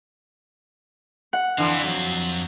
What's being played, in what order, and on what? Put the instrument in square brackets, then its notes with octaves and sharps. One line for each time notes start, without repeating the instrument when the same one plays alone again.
[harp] F#5
[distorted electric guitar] F2 F5 [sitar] D3 E3
[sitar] F#3